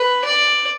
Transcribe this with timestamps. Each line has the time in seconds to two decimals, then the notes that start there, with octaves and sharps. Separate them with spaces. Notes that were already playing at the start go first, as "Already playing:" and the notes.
Already playing: B4
0.24 D5